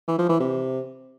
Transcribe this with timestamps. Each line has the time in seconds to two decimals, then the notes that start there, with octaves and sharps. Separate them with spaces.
0.08 E3
0.18 F3
0.29 E3
0.40 C3